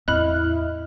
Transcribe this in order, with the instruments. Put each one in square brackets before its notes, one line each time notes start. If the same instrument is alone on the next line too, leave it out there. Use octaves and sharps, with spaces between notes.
[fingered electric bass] E2 A2 C4 [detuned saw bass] E4 [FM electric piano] D#5 F6 [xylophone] B5 F#6